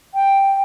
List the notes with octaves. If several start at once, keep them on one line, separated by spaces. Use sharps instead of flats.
G5